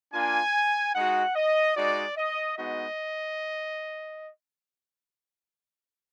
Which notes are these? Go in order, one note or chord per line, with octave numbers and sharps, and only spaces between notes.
A#3 D4 F4 G#5
G#3 D#4 F#4 F#5
D#5
G#3 D#4 F#4 D5
D#5
G#3 B3 D#4 F#4 D#5